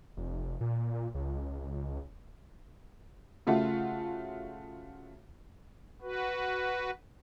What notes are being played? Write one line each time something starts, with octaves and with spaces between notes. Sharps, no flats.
F1
A#2
C#2
C#3 A3 F4 F#4
F#4 B4